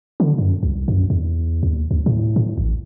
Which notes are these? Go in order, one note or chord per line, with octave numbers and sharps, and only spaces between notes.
D3
F#2
C2
F#2
E2
D#2
D2
A2
A2
A1